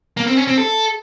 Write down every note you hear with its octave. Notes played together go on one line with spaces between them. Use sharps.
A#3
C4
C#4
C4
A4